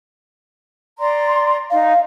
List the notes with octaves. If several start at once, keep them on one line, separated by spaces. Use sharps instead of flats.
D5 A#5 C6
D#4 F5